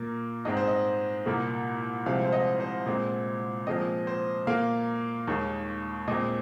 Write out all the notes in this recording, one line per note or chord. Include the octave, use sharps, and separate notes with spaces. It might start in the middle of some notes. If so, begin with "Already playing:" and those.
Already playing: A#2 A#3
G#2 G#3 C4 D#5
C5
D#5
C2 A#2 A#3
C2 C3 F3 G#3 C4 F5
C5
D#5
C5
A#2 G#3 C4
A#2 F3 G#3 C4 D#5
C5
A#2 A#3 F5
D#2 D#3 G#3
A#2 G#3 C4 D#5